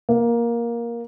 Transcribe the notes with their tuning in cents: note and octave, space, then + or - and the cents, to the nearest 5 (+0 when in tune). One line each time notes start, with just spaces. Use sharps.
A#3 +10